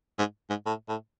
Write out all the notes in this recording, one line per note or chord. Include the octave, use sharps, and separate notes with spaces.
G#2
G#2
A2
A2